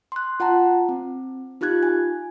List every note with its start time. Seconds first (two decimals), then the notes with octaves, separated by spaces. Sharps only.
0.12 C6 F#6
0.40 F4 F#5 A5 A#5
0.89 C4
1.61 D#4 F4 G4 F#6 G#6
1.83 G#5